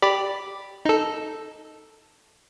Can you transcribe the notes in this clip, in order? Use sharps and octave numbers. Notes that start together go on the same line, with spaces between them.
G4 D5 B5
D#4 A4